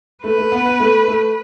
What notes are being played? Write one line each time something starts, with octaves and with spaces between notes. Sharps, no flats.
A3 B4
A3
B3
B3
A3
A3